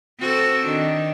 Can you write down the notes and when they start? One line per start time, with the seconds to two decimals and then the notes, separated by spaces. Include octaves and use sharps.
0.19 C4 F#4 A4
0.66 D#3 D4